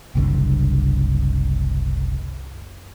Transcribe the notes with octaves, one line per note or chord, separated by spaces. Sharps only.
F#1 C2 D3